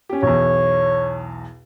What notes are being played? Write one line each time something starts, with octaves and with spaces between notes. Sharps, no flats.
C#4 G4
B1 E2 C#5